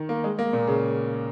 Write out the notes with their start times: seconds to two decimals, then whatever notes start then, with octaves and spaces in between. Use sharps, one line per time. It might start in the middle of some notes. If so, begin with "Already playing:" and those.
Already playing: D#3
0.09 A#3
0.24 G#3
0.39 A#3
0.53 A#2
0.67 C#3